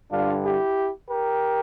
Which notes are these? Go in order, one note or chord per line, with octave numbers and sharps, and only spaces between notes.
G2 D3 G3 D4 F4
E4 G4
G4 A#4